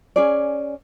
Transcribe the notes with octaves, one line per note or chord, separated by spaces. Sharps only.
C#4 G#4 D5